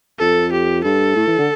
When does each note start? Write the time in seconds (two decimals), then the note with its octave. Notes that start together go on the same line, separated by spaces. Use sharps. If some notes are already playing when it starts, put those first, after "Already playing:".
0.19 F2 A4
0.53 G4
0.84 G2 A4
1.16 A2
1.27 E3
1.38 D3